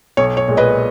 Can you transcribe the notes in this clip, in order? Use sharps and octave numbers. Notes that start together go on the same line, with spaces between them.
B1 C#5
C#5
A#2 G#3
B4 D#5